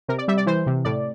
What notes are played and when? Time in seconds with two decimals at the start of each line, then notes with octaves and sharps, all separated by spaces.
0.08 C3 A#4
0.18 D5
0.28 G3 E5
0.37 D5
0.46 E3 C5
0.67 C3
0.85 A2 D5